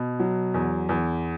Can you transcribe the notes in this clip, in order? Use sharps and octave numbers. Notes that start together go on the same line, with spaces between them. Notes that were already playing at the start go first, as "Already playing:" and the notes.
Already playing: B2
F#3
E2
E2